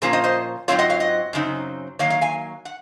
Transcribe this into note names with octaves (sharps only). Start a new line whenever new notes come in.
A#2 F3 A#3 C#4 F4 G#4 C5
C5 D#5
C5 D#5
G#2 F#3 C4 F4 C#5 F5
D#5 F#5
C#5 F5
D#5 F#5
F#2 C#3 F#3 C4 D#4
D#3 F#3 A#3 C#5 F5
C#5 F5
F5 G#5
F#5